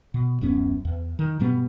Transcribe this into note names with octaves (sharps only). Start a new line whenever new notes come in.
B2
D1 F#2 B3 C#4
E2
D#3
G2 B2 G3 B3